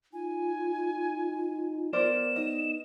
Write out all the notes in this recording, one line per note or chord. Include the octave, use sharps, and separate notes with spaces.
D#4 F4 G#5
B3 A#4 C5 D5 E7
D#4 D#5